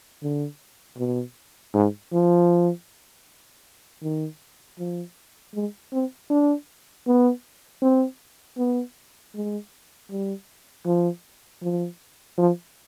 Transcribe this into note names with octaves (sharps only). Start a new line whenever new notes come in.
D3
B2
G#2
F3
D#3
F3
G#3
C4
D4
B3
C4
B3
G#3
G3
F3
F3
F3